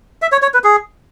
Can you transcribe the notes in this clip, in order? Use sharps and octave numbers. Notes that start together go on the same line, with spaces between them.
E5
C#5
C#5
B4
G#4